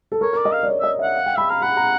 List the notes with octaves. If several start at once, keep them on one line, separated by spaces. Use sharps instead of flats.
A4
A#4 C#5
A#4
D5
D#5
F5
D5
C#5
D#5 E5
E5 F#5
F5
G5
E5 B5
F5 A#5
F#5 B5
A#5